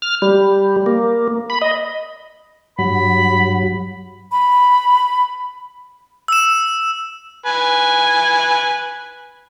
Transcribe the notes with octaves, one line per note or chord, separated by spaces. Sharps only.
F6
G3
A#3
B5
D#5
G2 F#3 B5
B5
E6 E7
B4 G#5